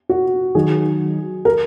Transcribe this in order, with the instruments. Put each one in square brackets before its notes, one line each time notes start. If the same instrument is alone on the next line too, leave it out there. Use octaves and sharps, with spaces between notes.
[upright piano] F#4
[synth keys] D#3 F#3 D#4 F#4 [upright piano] G#4
[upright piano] A#4